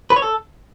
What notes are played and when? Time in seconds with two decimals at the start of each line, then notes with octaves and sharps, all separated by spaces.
0.10 B4
0.16 C#5
0.22 A4